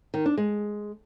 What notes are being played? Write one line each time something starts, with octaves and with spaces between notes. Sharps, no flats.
D#3
D4
G#3